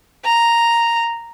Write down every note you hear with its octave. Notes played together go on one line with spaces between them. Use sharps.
A#5